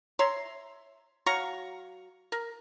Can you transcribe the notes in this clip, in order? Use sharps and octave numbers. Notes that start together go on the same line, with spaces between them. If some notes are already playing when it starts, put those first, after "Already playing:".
C#5 E5 A#5 C6
F#3 F5 A#5 C#6
A#4